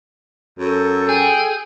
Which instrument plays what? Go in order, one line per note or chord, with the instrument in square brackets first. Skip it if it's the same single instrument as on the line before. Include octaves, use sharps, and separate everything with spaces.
[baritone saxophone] F#2 [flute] A4
[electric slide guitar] G#4 [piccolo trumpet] G5